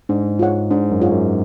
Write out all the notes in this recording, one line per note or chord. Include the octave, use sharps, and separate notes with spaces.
G#2 D4
F4 G#4 C#5 F#5
G#2 D4
F#2
F4 G#4 C#5 F#5
F#2